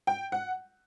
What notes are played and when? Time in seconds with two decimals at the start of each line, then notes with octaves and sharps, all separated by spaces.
0.07 G5
0.32 F#5